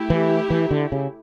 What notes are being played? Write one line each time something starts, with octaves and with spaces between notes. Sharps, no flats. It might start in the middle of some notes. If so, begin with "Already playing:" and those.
Already playing: A3 E4 G4
E3
E3
D3
C#3